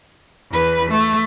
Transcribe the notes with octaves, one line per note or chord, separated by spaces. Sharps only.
E2 B4
A3